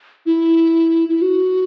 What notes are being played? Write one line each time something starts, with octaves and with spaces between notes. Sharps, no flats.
E4
E4
F#4